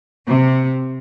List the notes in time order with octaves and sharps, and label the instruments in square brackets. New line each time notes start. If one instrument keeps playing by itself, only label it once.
[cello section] C3